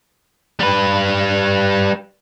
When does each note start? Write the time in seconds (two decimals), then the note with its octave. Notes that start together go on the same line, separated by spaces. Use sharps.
0.60 G3 B4